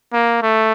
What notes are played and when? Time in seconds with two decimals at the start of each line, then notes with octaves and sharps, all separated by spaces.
0.13 A#3
0.42 A3